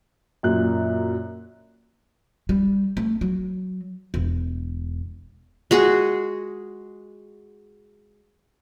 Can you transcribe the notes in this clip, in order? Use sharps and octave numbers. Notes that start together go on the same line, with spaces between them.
F#2 A#2 F#6
G3
A3
F#3
E1
G#3 F#4 G#4